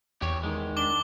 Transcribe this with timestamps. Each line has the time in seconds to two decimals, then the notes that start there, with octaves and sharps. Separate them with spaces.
0.22 E2 G4 C#5
0.43 D#3 G#3
0.77 D4 D6 G7